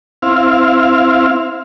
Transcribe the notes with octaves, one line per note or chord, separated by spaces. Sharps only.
C4 E4 F5